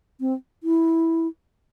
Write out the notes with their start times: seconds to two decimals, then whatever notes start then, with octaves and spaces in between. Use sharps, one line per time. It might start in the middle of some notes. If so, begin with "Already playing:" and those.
0.20 C4
0.63 E4